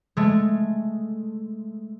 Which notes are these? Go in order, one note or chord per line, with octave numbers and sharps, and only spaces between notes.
G#3 A3